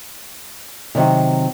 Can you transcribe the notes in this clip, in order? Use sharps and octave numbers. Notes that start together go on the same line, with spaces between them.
C3 D#3 F#3